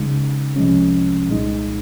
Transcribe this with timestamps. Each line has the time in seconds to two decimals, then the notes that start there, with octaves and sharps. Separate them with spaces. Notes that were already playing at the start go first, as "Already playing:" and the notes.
Already playing: C#2 C#3 G#3 D#4
0.56 C2 C3 F3 G#3 C#4
1.28 C2 A#2 G#3 D#4